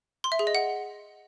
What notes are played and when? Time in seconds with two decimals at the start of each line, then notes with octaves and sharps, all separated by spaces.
0.24 C6
0.32 E5
0.39 G#4
0.47 D#5
0.55 F#5